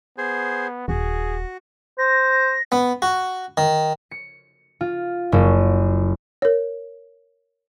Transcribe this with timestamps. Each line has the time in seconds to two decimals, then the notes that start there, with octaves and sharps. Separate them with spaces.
0.18 B3 G#4 C5
0.88 D#1 F#4 G#4
1.98 C5 A#6
2.72 B3
3.02 F#4
3.57 D#3
4.11 C#7
4.81 F4
5.32 F#1
6.42 A#4 C#5